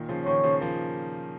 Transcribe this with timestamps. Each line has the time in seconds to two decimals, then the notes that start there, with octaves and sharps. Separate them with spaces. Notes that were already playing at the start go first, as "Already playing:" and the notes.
Already playing: A#2 D#3
0.09 C#3 F3
0.26 A#2 D#3 C#5
0.43 C#3 F3
0.61 F3 A#3